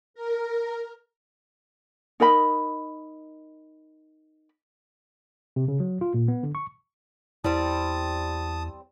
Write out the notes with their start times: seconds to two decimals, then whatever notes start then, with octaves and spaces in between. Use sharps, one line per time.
0.14 A#4
2.20 D#4 A#4 D#5 B5
5.56 C3
5.68 C#3
5.80 F#3
6.01 F4
6.14 A#2
6.28 B3
6.43 D3
6.55 C#6
7.44 E2 G3 C4 E4 A5 D#6